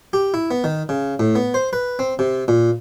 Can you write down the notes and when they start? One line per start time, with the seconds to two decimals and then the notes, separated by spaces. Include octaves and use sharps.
0.13 G4
0.34 E4
0.51 B3
0.64 D#3
0.89 C#3
1.20 A2
1.35 B3
1.54 C5
1.73 B4
1.99 C4
2.19 C3
2.48 A#2